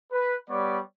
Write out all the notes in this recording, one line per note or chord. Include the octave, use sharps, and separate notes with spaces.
B4
G3 B3 C#5 D5